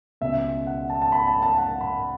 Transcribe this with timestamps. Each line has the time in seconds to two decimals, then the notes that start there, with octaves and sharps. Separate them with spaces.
0.21 C#2 B2 E5
0.67 F#5
0.90 A5
1.02 A5
1.12 B5
1.27 A5
1.42 A5
1.58 F#5
1.81 B5